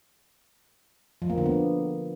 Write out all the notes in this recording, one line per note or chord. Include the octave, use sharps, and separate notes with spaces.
F3
A#3
D3
B3